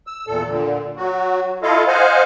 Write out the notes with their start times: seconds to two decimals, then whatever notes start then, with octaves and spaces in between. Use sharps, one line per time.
0.07 E6
0.27 E2 A#2 A4
0.48 A#2 D3
0.96 F#3 F#4
1.63 E4 F4 A4 D#5 F5
1.88 C5 D#5 F5 F#5 G#5